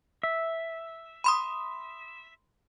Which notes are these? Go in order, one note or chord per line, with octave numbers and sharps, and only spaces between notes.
E5
B5 C6 D#6